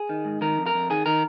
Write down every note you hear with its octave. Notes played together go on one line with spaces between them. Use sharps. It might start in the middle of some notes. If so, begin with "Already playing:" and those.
Already playing: G#4
D#3
G#2
D#3 A#4
F2
A#4
F2
D#3 G#4
D#3 A#4